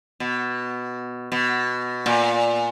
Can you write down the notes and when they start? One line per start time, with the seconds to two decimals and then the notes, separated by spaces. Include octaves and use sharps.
0.20 B2
1.32 B2
2.06 A#2